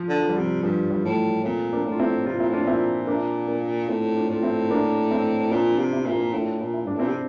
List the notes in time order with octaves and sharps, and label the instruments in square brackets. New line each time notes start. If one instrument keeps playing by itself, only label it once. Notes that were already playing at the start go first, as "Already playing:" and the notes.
Already playing: [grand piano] F3
[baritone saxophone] D3
[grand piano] F3
G3
[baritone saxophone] C3 [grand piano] F3
[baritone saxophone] G2 [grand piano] F3
[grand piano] E3 G3
[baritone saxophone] A2
[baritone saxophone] A#2 [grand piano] A3 C4
[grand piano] A#3 D4
[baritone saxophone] A2
[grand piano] F4
C4 E4
[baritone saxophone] C3 [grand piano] F4
[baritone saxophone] A#2 [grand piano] E4
[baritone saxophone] A2 [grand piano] D4 F4
[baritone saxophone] A#2
[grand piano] C4 E4
A#3 D4
A#3 D4
F4
[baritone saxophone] A2 [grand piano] C4 E4
[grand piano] D4 F4
[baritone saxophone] A2 [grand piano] F4
[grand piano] C4 E4
A#3 D4
C4 E4
[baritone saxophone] A#2 [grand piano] D4 F4
[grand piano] D4 F4
[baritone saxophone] C3
[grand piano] C4 E4
[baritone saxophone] A#2 [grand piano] E4
[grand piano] A#3 D4
[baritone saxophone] A2 [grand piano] D4 F4
[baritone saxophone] A#2
[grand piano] E4
[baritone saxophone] G2 [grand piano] D4
[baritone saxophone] A2
[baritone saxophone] A#2 [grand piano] C4 E4
[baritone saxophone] C3